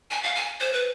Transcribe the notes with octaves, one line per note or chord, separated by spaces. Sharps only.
G#5
F5
G#5
C5
B4